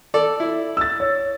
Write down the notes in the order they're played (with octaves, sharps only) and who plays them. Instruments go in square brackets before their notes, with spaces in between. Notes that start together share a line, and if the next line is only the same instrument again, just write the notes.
[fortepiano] A4 D5
E4
[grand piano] E6 A6
C#5